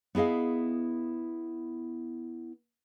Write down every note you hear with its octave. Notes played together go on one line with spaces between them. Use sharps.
B3 E4 G#4 D#5 F5